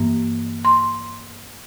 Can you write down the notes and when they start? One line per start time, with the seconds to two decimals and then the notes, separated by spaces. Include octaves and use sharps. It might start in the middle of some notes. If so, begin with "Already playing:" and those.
Already playing: G2 E3 A#3
0.65 C6